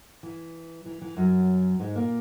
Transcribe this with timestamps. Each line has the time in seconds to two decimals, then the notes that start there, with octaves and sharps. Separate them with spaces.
0.23 E3
0.86 E3
1.02 E3
1.17 F#2 F#3
1.80 G#2 G#3
1.96 A#2 A#3